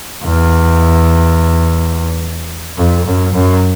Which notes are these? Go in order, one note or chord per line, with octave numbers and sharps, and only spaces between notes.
E2
F2
F#2
F#2